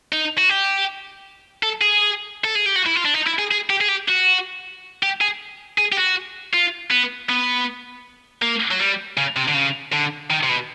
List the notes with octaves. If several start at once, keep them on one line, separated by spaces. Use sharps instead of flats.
D#4
F#4
G4
A4
G#4
A4
G#4
G4
F#4
E4
F4
D4
D#4
E4
G#4
G#4
G4
G#4
G4
F#4
G4
G#4
G#4
G4
F#4
F4
B3
B3
A#3
F#3
G3
C#3
C3
D3
C#3
D3
D#3
C3
B2